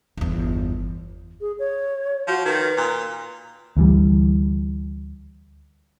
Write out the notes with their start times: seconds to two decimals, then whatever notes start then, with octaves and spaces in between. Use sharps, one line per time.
0.17 G1 E2
1.41 G#4
1.59 C#5
2.28 F3 F#4
2.45 D#3 B4
2.77 A#2
3.77 D2 E3 G3